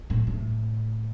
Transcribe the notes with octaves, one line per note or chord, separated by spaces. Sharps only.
A2
A2